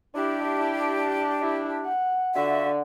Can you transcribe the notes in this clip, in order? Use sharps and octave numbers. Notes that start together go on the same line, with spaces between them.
D4 E4 G4
E4
E4
F#5
D3 F4 F#4 E5